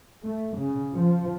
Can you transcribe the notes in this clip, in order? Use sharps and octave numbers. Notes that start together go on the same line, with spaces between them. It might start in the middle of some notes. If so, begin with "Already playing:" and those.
A3
C#3
F3